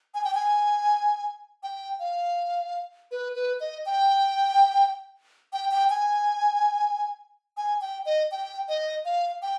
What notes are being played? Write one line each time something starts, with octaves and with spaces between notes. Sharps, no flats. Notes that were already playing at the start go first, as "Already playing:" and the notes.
G#5
G5
G#5
G5
F5
B4
B4
D#5
G5
G5
G5
G#5
G#5
G5
D#5
G5
D#5
F5
G5